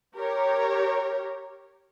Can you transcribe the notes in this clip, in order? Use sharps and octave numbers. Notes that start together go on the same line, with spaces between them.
G4 A#4 C#5